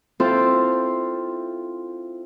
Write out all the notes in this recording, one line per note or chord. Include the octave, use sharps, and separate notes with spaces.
C4 E4 F4 A4 C5